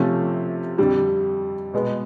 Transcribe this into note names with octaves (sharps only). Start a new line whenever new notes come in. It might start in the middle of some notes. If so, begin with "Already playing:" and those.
Already playing: C3 F3 A3 C#4
F2 D3 G3
B2 G#3 B3